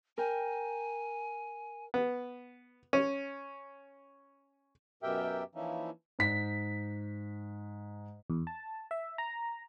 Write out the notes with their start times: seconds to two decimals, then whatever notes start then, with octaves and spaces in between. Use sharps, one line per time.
0.18 A#4 G5 G#5
1.94 B3
2.93 C#4
5.03 F#2 B2 G4 A#4 E5 G5
5.55 E3 F3 A#3 C#4 D#4 E4
6.19 G#2 B6
8.30 E2
8.47 A5
8.91 E5
9.18 A#5